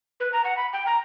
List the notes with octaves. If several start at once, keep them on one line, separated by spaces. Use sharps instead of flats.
B4
A#5
F#5
B5
G5
A#5